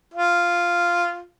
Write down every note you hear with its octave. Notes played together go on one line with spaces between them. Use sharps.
F4